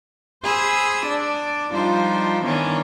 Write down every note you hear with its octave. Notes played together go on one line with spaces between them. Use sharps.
G#4 C5 B5 D#6 E6
D4 D5
F3 G3 D4 D#4 F4 C5
D#3 E3 B3 C#4 D4